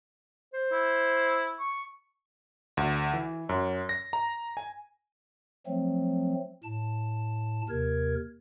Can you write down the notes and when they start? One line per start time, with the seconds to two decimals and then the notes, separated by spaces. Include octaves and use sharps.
0.54 C5
0.72 E4
1.60 C#6
2.77 D2
3.14 E3
3.49 F#2
3.89 A#6
4.13 A#5
4.57 G#5
5.67 F3 F#3 A3 C4
6.64 A2 A5
7.69 D#2 C3 A#4 G#6